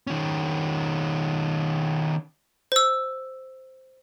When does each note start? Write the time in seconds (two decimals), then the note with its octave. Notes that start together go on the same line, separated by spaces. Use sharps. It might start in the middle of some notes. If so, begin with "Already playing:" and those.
0.07 D#3 C#4
2.72 C5 E6